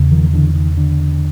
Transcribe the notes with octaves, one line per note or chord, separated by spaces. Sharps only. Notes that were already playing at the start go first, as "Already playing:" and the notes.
Already playing: E2 C#3
D#3 F3
D3 E3
D#3
D3